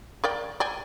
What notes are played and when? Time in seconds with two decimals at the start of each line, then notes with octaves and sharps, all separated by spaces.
0.24 A#4 D5 G5
0.60 D5 G5 G#5